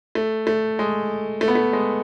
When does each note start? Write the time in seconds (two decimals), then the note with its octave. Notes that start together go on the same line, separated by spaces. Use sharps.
0.15 A3
0.47 A3
0.79 G#3
1.41 A3
1.48 B3
1.55 A3
1.73 G#3